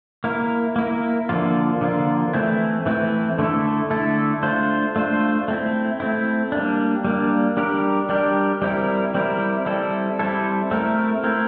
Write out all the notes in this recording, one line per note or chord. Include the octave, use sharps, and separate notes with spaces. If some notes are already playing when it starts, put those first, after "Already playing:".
A#3 E4 A#4
A#3 E4 A#4
D3 F3 A#3 F4
D3 F3 A#3 F4
E3 A3 C4 E4
E3 A3 C4 E4
D3 A3 E4 A4
D3 A3 E4 A4
A3 D4 F4 C5
A3 D4 F4 C5
A3 C4 E4
A3 C4 E4
G3 A#3 D4
G3 A#3 D4
G3 D4 G4 A#4
G3 D4 G4 A#4
G3 C4 E4 A#4
G3 C4 E4 A#4
G3 C4 E4 A4
G3 C4 E4 A4
A3 C4 E4 A#4
A3 C4 E4 A#4